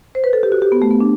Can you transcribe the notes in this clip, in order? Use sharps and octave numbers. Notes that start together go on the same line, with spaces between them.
C5
B4
A4
G4
F#4
G4
B3
A3
B3
D4